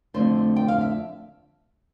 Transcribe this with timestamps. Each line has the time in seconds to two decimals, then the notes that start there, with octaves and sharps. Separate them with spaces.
0.14 F2 D3 A3 C5
0.56 G5
0.68 F5
0.81 E5